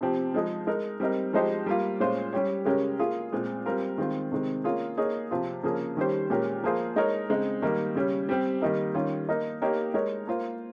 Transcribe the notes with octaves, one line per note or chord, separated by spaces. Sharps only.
C3 F3 C4 G4
F3 G#3 D#4 G#4
G#3 D#4 A#4
G3 C4 D#4 A#4
F3 G#3 D#4 G4 C5
G3 A#3 F4
A#2 G#3 C#4 F4 C5
G3 C#4 G4 C#5
C#3 G#3 C#4 G4 A#4
A#3 F4 G#4
A#2 G#3 C4
G3 C4 F4 A#4
D#3 G#3 C4 F4
C3 D#3 G#3 C4
A#3 C#4 F4 G#4
A#3 D#4 G#4 C#5
C3 F3 C4 F4
C#3 F3 A#3 C#4 G#4
D#3 G3 C#4 G4 C5
A#2 G#3 C#4 G4 A#4
F3 A#3 F4 G#4 C5
G#3 D#4 A#4 C#5
C#3 G#3 C4 D#4
D#3 G3 A#3 D#4
C#3 G3 C#4
G3 C4 G4
D#3 G3 A#3 D#4 A#4
D#3 G3 C#4 F4
A#3 D#4 A#4
A#3 D#4 G4 A#4 C#5
G#3 D#4 A#4 C#5
A#3 F4 C5